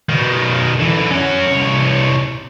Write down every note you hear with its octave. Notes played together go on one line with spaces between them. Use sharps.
B2 D#3
D3 E3
C#4 F#5
C2 C#5